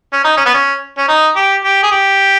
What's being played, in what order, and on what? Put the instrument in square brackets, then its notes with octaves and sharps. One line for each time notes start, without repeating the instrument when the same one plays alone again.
[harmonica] C#4
D#4
C#4
B3
C#4
C#4
D#4
G4
G4
G#4
G4